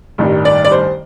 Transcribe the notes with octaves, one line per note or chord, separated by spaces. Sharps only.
A1 G2 D#3 G3
D5
D5
C5